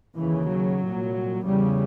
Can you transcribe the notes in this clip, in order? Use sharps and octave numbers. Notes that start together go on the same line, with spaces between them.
D#2 C#3 E3
F#3
C2 A#2
E2 C#3 G3